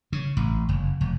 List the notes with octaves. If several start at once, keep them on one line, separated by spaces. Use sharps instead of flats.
C#3
A1
F#1
F1